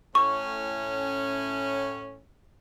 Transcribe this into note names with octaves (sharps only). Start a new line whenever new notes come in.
A2 C#4 C#6